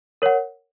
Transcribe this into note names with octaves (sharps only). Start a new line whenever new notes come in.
A#4 C#5 F#5